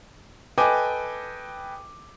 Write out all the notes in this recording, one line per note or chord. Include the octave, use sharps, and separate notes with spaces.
A4 B4 D#5 G5 G#5 D6